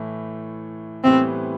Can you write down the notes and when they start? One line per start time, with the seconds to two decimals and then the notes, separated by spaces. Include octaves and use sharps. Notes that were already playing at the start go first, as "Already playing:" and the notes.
Already playing: A2 E3 A3
1.04 A2 E3 G3 B3 C4